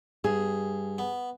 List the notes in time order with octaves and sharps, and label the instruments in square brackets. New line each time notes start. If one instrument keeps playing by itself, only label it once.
[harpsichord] G2 [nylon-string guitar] G#4
[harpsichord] B3